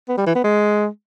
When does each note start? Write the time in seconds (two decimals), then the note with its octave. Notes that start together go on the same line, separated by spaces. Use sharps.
0.09 B3
0.17 G3
0.26 E3
0.35 B3
0.44 G#3